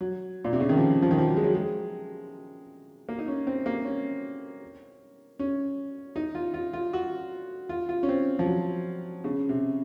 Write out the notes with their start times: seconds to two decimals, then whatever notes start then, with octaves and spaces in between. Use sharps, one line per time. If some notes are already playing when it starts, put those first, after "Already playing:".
0.01 F#3
0.45 A#2
0.53 C3
0.60 C#3
0.69 D#3
0.77 F3
1.02 F3
1.11 D#3
1.18 F3
1.28 F#3
1.37 G#3
1.44 F#3
1.54 G#3
3.09 A#3
3.18 D#4
3.28 C#4
3.47 C4
3.66 A#3
3.85 C#4
5.39 C#4
6.16 D#4
6.35 F4
6.54 F4
6.73 F4
6.93 F#4
7.69 F4
7.89 F4
8.03 C#4
8.09 C4
8.39 F3
8.46 F#3
9.24 C#3
9.49 C3